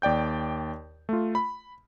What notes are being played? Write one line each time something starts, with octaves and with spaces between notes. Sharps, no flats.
D#2 D5 G5 G6
A3 F4
B5